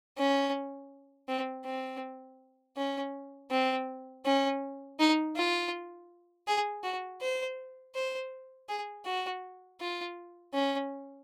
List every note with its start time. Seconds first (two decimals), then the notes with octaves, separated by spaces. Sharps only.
0.17 C#4
1.28 C4
1.65 C4
2.77 C#4
3.51 C4
4.25 C#4
4.99 D#4
5.36 F4
6.48 G#4
6.83 F#4
7.22 C5
7.95 C5
8.69 G#4
9.06 F#4
9.81 F4
10.54 C#4